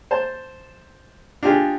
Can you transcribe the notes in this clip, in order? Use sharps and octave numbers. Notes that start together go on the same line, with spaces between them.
C5 A5
D4 D#4 F4 G4 G#4